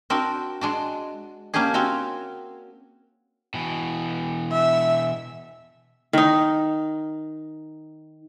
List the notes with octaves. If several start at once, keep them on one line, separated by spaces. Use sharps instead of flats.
C4 D4 F#4 A#4
G#3 D4 F#4
A#3 C#4 D4 G4 G#4
C4 C#4 F#4 C#5
B2 E3
E5
D#3 D#4